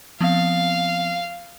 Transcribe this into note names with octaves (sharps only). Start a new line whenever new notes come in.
F3 B3 C4 F5